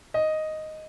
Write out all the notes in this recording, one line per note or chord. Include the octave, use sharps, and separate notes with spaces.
D#5